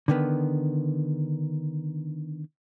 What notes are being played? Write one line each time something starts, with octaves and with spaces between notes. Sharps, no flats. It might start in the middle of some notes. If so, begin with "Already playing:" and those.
D3 D#3 B3